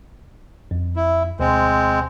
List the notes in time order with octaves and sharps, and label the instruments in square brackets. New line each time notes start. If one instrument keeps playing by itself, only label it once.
[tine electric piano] F2
[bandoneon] E4
[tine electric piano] D2 B2 [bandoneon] G#3 C4